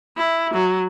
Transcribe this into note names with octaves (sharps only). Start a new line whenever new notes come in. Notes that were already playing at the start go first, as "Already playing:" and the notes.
E4
F#3